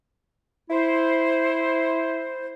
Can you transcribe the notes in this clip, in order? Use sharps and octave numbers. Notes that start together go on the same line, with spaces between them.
E4 C5